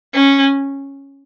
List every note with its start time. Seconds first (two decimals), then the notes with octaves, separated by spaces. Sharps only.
0.14 C#4